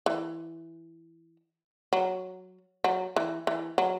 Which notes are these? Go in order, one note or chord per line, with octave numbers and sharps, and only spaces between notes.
E3
F#3
F#3
E3
E3
F#3